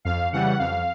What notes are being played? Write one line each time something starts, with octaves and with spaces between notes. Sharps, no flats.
F2 F5
C#3 E3 G3 F#5
F2 F5